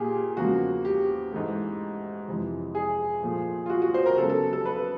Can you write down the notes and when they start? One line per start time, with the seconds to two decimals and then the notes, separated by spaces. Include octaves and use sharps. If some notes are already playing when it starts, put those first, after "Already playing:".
Already playing: A#2 A#3 G4 G#4
0.37 E2 C#3 F3 A#3 F#4
0.85 G4
1.32 G#2 E3 A3
2.28 F2 C3 E3
2.75 G#4
3.23 A#2 F3 A3
3.66 F4
3.70 F#4
3.82 F#4
3.94 C5
4.06 A#4
4.18 C#3 F#3 B3 A4
4.30 A4
4.53 A4
4.65 B4